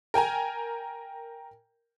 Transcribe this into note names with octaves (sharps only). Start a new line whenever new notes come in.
A#4 G5 G#5 A#5